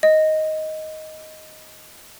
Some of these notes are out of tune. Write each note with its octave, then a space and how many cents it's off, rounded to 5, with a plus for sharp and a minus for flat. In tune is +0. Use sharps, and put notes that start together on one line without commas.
D#5 +5